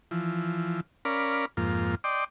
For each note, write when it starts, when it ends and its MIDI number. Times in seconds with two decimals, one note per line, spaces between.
0.11 0.80 52
0.11 0.80 53
1.05 1.45 61
1.05 1.45 70
1.05 1.45 74
1.05 1.45 77
1.05 1.45 83
1.57 1.95 41
1.57 1.95 44
1.57 1.95 58
1.57 1.95 65
2.04 2.24 74
2.04 2.24 75
2.04 2.24 79
2.04 2.24 84
2.04 2.24 86